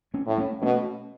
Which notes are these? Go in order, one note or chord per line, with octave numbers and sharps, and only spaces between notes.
A3 C#4
A2
A3 C#4
B2 A3 C#4